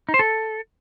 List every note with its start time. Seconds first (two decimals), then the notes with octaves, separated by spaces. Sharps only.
0.09 D#4
0.14 C5
0.19 A4